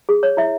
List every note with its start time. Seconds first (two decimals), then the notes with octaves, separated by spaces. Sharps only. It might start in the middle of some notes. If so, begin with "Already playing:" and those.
0.09 G#4
0.23 C#5
0.37 E4 E5